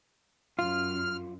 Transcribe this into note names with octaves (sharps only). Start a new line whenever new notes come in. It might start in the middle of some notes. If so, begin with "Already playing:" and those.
F#2 F4 F6